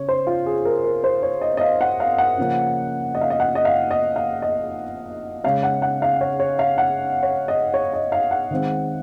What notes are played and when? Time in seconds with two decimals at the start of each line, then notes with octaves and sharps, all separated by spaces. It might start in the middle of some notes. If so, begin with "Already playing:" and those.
Already playing: C#3 C#5
0.09 C5
0.27 F4
0.46 G#4
0.65 A#4
0.84 A#4
1.04 C5
1.23 C#5
1.41 D#5
1.57 D#5
1.61 F5
1.81 F#5
2.00 F5
2.18 F#5
2.38 C#3 F3 A#3 C#4
3.15 D#5
3.21 F5
3.30 D#5
3.40 F#5
3.55 D#5
3.65 F5
3.91 D#5
4.16 F5
4.42 D#5
5.44 C#3 G#3 C#4 F5
5.63 F#5
5.82 F#5
6.02 F5
6.21 C#5
6.40 C#5
6.59 F5
6.78 F#5
7.23 C#5
7.48 D#5
7.74 C#5
7.93 D#5
8.12 F5
8.31 F#5
8.50 D#3 G#3 C4